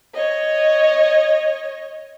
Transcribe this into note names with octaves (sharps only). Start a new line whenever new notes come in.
C#5 D#5